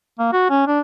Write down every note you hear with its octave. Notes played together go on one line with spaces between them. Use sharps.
A#3
F#4
C#4
D4